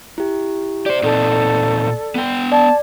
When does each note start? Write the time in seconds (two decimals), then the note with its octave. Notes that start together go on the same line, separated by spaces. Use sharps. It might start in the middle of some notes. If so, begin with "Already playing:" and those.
0.18 E4 G4
0.86 G4 C5 D5
1.03 A#2 C4 D#4 A4
2.15 B3 G5
2.52 D5 A5